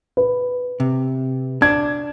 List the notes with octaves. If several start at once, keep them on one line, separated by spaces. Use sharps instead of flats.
B4
C3
D4 G#6